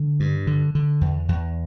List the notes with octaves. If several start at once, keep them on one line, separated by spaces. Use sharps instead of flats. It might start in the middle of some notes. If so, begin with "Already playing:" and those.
Already playing: D3
G2
D3
D3
E2
E2